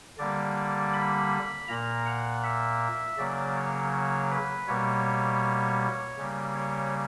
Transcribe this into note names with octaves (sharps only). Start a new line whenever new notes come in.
D3 G3 A#3 D5
B5
A#2 A#3 A#5
F#5
E5
C#3 F#3 A#3 D5
C#5
C#5
B4
B2 G3 A#3 C#5
C#3 G3 A#3
C#5